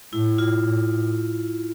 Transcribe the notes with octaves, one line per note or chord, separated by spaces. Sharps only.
A2 E4
F4
A2